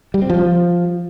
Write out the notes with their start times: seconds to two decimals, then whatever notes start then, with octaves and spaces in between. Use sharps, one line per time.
0.14 G3
0.22 C4
0.30 F3